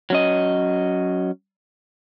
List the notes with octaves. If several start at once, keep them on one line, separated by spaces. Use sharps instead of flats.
F#3 C#4 D#5